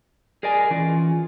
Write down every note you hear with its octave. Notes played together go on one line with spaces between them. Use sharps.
G#4 A#4 D5 D#5 G#5
E3 C#4 F4